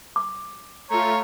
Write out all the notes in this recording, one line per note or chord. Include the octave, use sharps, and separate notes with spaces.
D6
A3 F4 C#5 A#5